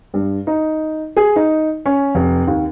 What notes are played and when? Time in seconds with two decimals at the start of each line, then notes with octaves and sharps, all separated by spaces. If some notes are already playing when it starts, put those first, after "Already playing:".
0.14 G2
0.47 D#4
1.16 G#4
1.36 D#4
1.86 C#4
2.15 F1
2.47 D#2